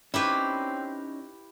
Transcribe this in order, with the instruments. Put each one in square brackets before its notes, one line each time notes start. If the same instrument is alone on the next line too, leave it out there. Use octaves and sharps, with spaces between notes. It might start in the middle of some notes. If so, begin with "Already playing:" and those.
[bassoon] C4 [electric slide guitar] C#4 D#4 C#5 [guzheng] E4 G4 B4